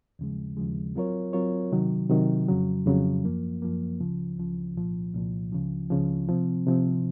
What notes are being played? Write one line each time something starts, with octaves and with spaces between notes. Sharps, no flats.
D#2 C#3 F3 G#3
D#2 C#3 F3 G#3
F#3 C4 F4 A#4 C#5
F#3 C4 F4 A#4 C#5
C3 D#3 F#3
C3 D#3 F#3
F2 C#3 F#3
F2 C#3 F#3
F#2 F3 A#3
F#2 F3 A#3
C#2 C#3 F3
C#2 C#3 F3
C2 A#2 F3
C2 A#2 F3
C#2 C#3 F3
C#2 C#3 F3
C3 F3 C4
C3 F3 C4